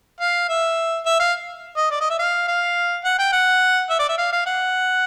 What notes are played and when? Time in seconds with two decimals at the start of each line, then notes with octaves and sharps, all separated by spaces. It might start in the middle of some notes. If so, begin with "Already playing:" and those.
0.21 F5
0.49 E5
1.06 E5
1.20 F5
1.76 D#5
1.91 D5
2.00 D#5
2.10 E5
2.19 F5
2.48 F5
3.05 F#5
3.19 G5
3.33 F#5
3.90 E5
3.99 D5
4.09 E5
4.18 F5
4.33 F5
4.46 F#5